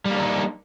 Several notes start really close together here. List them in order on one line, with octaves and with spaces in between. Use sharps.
G3 A#3 D4 D#4